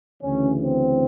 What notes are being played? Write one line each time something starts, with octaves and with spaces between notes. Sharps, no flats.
D2 C#3 E3 C#4
C4